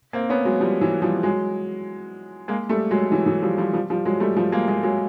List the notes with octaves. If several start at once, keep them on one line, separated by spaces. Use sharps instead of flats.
A#3 C4
B3 C#4
F#3 G#3
F3 G3
E3 F#3
F3 G3
F#3 G#3
G#3 A#3
G3 A3
F#3 G#3
E3 F#3
E3 F#3
F3 G3
F3 G3
F3 G3
F3 G3
F#3 G#3
G3 A3
F3 G3
G#3 A#3
G#3 A#3
F#3 G#3